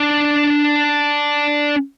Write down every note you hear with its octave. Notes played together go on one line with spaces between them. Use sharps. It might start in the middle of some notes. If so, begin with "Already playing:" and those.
Already playing: D4